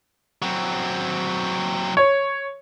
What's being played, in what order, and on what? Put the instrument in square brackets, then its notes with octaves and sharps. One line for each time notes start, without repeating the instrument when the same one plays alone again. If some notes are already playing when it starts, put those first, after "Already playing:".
[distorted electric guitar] F#3 C4
[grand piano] C#5